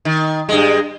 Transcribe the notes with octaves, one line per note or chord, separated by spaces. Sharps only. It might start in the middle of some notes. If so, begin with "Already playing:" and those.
D#3
G2 G#3